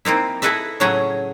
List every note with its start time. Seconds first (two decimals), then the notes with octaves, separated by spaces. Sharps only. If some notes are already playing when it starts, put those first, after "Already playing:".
0.05 A#3 C4 D#4 E4
0.42 E4 G#4 A4 B4 D#5 E5
0.80 A2 C#3 F#3 C#4 G#4